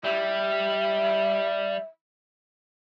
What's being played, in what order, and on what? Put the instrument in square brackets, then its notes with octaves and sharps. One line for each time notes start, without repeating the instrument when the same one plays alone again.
[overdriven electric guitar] G3 [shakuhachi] E5